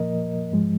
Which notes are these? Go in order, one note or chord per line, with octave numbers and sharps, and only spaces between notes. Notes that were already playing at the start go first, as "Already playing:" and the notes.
Already playing: A#2 F3 A#3 A#4 D#5
G#2 F3 G#3